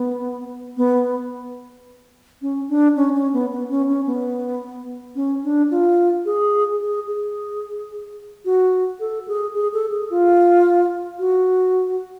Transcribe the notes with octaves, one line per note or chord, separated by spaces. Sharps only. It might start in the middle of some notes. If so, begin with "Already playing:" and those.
Already playing: B3
B3
C#4
D4
C#4
C#4
B3
B3
C#4
C#4
B3
C#4
D4
F4
G#4
G#4
G#4
F#4
A4
G#4
G#4
A4
G#4
F4
F#4